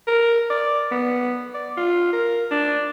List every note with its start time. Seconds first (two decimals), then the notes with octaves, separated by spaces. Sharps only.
0.07 A#4
0.50 D5
0.91 B3
1.54 D5
1.77 F4
2.13 A#4
2.51 D4